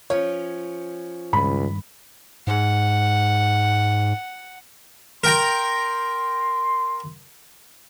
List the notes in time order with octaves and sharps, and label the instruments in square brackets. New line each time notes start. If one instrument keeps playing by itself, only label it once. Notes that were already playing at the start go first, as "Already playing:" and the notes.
[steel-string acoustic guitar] F3 C#4 [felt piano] C#5
[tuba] C#2 [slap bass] G2 D#3 [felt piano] B5
[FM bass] G#2 [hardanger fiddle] F#5
[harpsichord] A#4 G5 A#5 [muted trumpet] C6